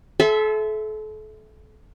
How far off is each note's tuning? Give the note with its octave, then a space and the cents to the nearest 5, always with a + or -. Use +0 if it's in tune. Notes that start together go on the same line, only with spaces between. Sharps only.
A4 -35 E5 +0 C6 -30